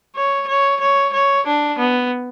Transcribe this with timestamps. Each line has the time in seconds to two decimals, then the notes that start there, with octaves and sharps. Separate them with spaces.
0.16 C#5
0.48 C#5
0.81 C#5
1.13 C#5
1.46 D4
1.79 B3